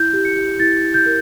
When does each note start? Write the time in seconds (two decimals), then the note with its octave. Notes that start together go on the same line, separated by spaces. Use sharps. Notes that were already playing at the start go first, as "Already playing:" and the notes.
Already playing: E4 G6
0.13 G4
0.25 C#7
0.36 G4
0.59 E4 A6
0.83 E4
0.94 G6
1.06 A#4